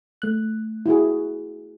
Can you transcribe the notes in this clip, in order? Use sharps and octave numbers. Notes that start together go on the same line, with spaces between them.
A3 F#6
E4 F#4 G#4